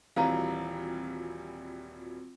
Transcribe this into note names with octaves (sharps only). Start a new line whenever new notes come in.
D#1 E3 G3 C4 F4 F#4 F5 A#5